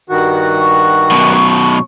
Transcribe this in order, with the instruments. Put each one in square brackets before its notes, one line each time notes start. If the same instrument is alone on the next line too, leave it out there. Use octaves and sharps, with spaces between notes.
[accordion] G2 D#3 F#4
[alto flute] C#6
[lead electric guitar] F#2 B2